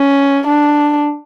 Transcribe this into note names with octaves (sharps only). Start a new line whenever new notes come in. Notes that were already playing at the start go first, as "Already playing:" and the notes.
Already playing: C#4
D4